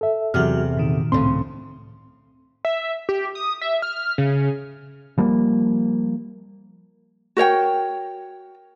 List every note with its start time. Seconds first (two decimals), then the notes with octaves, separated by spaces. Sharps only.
0.01 A4 E5
0.34 E2 C3 F#3 F#4 F6
0.77 A#2 D#3
1.12 C#2 A2 C#3 C4 C6
2.65 E5
3.09 G4
3.35 D#6
3.61 E5
3.82 F6
4.18 C#3
5.18 F3 G3 A#3
7.37 F#4 A#4 C#5 G5